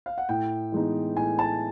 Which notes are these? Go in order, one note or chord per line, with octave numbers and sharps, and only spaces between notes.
F5
F#5
A2 G5
E3 G#3 B3 D#4
A2 G#5
A5